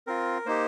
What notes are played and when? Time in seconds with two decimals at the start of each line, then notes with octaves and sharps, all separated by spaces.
0.07 C4 F4 A#4
0.46 A#3 D#4 G4 C5